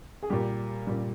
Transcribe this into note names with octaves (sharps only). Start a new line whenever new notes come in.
G#4
A#2 G3 G4
A#2 G3